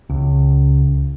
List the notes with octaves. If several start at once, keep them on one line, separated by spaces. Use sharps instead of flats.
C#2